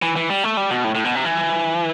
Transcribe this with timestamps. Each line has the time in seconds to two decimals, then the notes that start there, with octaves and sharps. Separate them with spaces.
0.02 E3
0.16 E3
0.30 G3
0.44 A3
0.57 G3
0.71 B2
0.84 A2
0.95 A2
1.04 B2
1.15 C3
1.25 E3